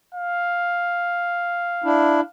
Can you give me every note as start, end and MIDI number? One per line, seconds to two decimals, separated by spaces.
0.14 2.30 77
1.84 2.21 62
1.84 2.21 64